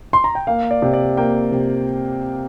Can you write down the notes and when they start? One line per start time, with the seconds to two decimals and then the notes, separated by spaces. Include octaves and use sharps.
0.13 C6
0.24 A#5
0.35 G5
0.47 A#3 F5
0.71 D5
0.82 C3
0.94 D5
1.17 A#3 G5
1.52 C3